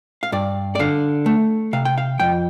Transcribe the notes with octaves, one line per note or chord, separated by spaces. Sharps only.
F5
G2 D5
D5
D3 F5
A3
C3 F5
G5
F5
F2 G5